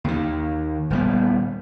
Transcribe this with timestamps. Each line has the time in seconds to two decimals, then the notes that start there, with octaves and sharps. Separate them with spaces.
0.04 D#2 D#3
0.90 D#1 G3 B3